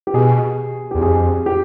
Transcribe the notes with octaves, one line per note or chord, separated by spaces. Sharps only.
G4
B2 G#4
E2 G4
F2 G#4
G4